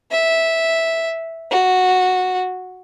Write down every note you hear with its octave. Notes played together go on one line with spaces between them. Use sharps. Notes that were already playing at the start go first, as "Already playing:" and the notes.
E5
F#4